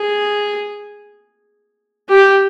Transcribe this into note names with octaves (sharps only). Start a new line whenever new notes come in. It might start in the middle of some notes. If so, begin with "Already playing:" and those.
Already playing: G#4
G4